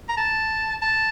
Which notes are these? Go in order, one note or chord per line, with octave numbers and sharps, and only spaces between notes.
A#5
A5
A5